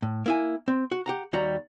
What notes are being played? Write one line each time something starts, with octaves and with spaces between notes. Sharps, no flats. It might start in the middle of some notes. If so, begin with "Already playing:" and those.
A2
A#3 E4 G#5
C4
F#4
G4 F#5 A#5
D#2 G3 F#4 A#5